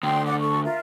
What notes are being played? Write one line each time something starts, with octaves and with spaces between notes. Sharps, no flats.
D2 G5 C6
D5 F#5 D6
A4 C#6
F4 A#4 E5